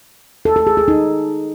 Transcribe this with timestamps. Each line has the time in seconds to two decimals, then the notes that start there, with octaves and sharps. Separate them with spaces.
0.45 A4
0.56 A4
0.67 G#4
0.77 G#4
0.88 D#4